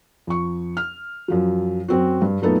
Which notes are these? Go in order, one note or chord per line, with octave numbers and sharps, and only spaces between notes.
F2 C#6
F6
F#2 F3 F#3
F#2 C4 F#4
G2
F#2 A#2 A3 B3 D#4 A4